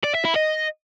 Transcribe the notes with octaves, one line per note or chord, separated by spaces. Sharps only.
D5
E5
E4
D#5